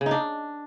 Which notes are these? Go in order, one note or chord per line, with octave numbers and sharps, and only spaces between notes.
C#3
D#4
D4